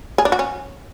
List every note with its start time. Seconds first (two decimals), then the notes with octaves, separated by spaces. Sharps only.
0.18 G#4
0.25 D4
0.32 F#4
0.39 C#4